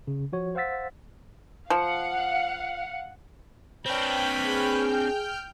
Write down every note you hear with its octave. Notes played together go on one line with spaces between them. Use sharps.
C#3
F3 F#4 C#5
C5 F5 F#5 E6 A6 B6
F3 F5 F#5
C4 D4 B4 C#5 G5 B5 F6 G6
G#4